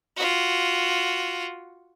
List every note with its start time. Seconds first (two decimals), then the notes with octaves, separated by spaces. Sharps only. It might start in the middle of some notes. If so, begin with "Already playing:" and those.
0.17 F4 F#4